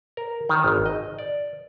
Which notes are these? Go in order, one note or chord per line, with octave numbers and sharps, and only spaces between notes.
A#4
D#3
G#1
D#5
D5